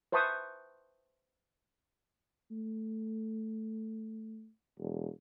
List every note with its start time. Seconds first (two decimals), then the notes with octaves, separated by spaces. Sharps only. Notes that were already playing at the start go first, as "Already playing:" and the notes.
0.12 B4 C5 E5 A5 C#6 D#6
2.51 A3
4.78 E1